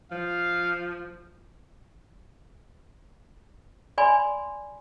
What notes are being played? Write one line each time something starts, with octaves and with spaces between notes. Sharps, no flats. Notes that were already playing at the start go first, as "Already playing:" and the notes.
F3 F5
D5 G#5 B5 C6